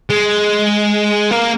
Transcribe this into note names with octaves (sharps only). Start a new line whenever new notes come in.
G#3
A#3